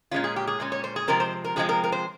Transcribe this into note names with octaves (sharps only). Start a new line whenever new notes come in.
A#2 G#3 C#4 F4
G#4
G4
G#4
A#2 G#3 C#4
C#5
C5
G#4
C3 F3 G#3 C4 A#4
C5
A#4
C3 F3 G#3 C4 G#4
A#4
A#4
C5